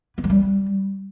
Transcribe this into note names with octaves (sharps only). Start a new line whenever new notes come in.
B3
F#3
G3